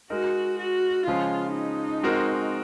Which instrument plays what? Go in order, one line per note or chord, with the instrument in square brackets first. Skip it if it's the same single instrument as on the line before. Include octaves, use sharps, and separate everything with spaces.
[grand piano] G#3 D#4 A#4 [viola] F#4
[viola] F#4
[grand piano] C#3 F3 G#3 C#4 G#4 [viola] F4
[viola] D#4
[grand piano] G#3 C4 F#4 A#4